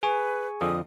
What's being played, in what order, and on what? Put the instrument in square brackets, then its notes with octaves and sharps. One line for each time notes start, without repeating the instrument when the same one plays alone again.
[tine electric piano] G#4 G#5 C#6 [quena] B4
[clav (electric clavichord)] F2 D3 F3 [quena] D#6